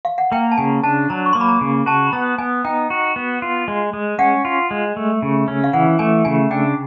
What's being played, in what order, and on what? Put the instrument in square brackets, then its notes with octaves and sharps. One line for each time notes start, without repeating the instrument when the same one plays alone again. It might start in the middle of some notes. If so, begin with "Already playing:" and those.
[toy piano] F5
F#5
[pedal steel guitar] A#3 [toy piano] G5
[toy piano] A5
[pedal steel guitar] C#3 [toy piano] G#5
[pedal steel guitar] D4 [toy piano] A5
[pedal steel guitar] F#3 [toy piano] A#5
[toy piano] C#6
[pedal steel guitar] A#3 [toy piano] C6
[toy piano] B5
A#5
[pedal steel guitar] C#3
[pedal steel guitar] F#4 [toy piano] A5
[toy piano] B5
[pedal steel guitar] B3 [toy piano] A#5
[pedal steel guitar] B3 [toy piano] G#5
[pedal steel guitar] D#4 [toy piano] G5
[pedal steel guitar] F#4
B3
F4
G#3
G#3
[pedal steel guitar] C#4 [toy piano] F#5
[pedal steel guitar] F4
G#3
A3
C#3
C#4
[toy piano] F5
[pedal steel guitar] E3 [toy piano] F#5
[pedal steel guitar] A3 [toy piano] G#5
[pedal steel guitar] C#3 [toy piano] G#5
[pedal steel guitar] D4 [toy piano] G5